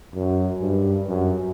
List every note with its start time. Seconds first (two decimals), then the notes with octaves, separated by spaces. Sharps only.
0.15 F#2
0.61 G2
1.09 F#2